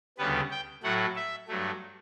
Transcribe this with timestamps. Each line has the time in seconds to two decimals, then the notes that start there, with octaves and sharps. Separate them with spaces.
0.18 D2 C#3 G3 B3 B4
0.51 G5
0.83 A2 F#3 A3 F#5
1.16 E5
1.48 G2 F#3 A3